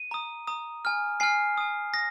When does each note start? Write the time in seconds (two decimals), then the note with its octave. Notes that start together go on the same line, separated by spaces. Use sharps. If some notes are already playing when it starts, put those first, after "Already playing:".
Already playing: D#7
0.11 A#5 D#6
0.47 A#5 D#6
0.85 G#5 F6
1.20 G#5 F6 C7
1.58 G#5 D#6
1.93 D#6 A#6